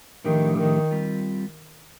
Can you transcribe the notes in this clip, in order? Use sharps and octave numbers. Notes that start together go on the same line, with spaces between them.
A2 D#3 F3 A3 D4 G4
D#3
G3 C4 F4